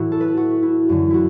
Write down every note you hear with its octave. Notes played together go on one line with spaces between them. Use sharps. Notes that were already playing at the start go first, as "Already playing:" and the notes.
Already playing: A2 E3 E4 F#4
A4
B4
A4
F#4
E4
F#2 D3 F#4
E4 F#4